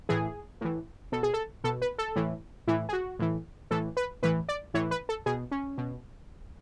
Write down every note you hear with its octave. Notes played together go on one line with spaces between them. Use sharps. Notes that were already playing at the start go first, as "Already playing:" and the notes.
A2 E3 G#4
A2 E3
B2 A4
G#4
A4
B2 A4
B4
A4
A2 E3
A2 E3 E4
G#4
F#4
A2 E3
A2 E3 A4
B4
A2 E3 B4
D5
A2 E3 C#5
B4
A4
B2 G#4
C#4
B2